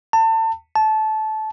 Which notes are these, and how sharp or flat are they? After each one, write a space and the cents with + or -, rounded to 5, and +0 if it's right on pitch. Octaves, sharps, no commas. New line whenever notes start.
A5 +30
A5 -20